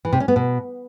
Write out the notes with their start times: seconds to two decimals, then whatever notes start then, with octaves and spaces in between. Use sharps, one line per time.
0.05 E3
0.12 C3
0.20 C#4
0.28 B3
0.36 B2